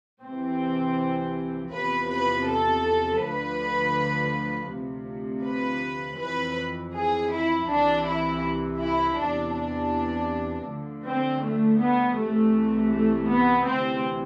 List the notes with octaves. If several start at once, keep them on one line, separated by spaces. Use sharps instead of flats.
C2 C3 E3 C4
E2 C3 F3 B4
B4
A4
D2 D3 F3 B4
D2 C3 F3
B4
F2 E3 B4
G#4
E4
C2 C3 E3 D4
E4
E4
E2 C3 E3 D4
D4
D2 D3 F3
C4
A3
B3
C2 C3 E3 A3
A3
B3
D2 C3 E3 C4